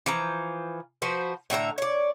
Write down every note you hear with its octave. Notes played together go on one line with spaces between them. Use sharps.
E3 F3 A#5
F3 F#4 B4 C5
A2 D3 E5 A#5
C#5 D5